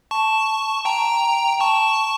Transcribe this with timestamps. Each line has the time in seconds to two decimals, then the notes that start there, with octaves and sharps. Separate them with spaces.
0.11 A5 C#6
0.85 G5 A#5
1.60 A5 C#6